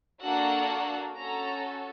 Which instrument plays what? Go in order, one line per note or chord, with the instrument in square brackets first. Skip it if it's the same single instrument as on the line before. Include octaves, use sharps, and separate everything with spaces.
[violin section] A#3 D4 F#4 A4 F#5
C#4 F#4 A4 A#5